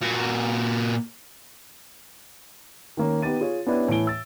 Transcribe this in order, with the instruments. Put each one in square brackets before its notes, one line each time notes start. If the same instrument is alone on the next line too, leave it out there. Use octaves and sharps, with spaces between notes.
[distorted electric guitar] A#2 F#4
[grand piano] D#3 A#3 C#4
B3 D#4 G4 B4 A6 D#7
F4 G#4 C#5
B3 C#4 D4 E4 G4 B4
A2 E3 G#5 D7 G7
E6 A6